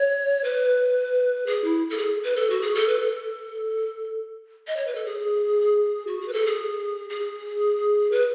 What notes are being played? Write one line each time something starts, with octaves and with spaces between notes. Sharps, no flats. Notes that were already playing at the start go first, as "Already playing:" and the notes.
Already playing: C#5
B4
G#4
E4
A4
G#4
B4
A4
F#4
G#4
A4
B4
A4
D#5
C#5
B4
A4
G#4
F#4
G#4
B4
A4
G#4
G#4
B4